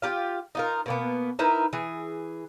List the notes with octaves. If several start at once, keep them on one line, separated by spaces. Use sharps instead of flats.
F4 G4 F5
D#4 F4 A#4
B2 A#3 B3
D#4 E4 A#4 B4
E3 G#4